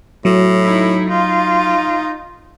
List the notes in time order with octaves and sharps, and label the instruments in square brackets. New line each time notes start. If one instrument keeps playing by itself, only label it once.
[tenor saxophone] A2 [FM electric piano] F#3
[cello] D#4 E4
[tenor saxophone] D#4 [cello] F4